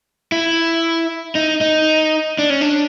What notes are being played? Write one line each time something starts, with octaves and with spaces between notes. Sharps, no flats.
E4
D#4
D#4
D4
C#4
D4